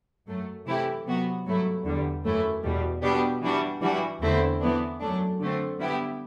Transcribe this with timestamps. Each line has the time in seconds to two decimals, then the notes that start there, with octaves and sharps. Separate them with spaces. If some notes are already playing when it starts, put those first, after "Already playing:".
0.27 F#2 F#3 A3
0.66 C3 E3 A3 E4 G4
1.06 C3 F#3 B3 F#4
1.45 G2 F#3 A3 E4
1.84 E2 D3 G3
2.24 F#2 E3 A3 E4
2.63 E2 B2 G3
3.02 B2 G3 B3 D4 G4
3.42 E3 G3 D4 F#4
3.81 E3 G3 D4 F#4
4.21 E2 D3 A3 C4 E4
4.60 E3 B3 D4
5.00 F#2 F#3 A3 D4
5.40 D3 A3 C4
5.79 D3 G3 B3 E4 G4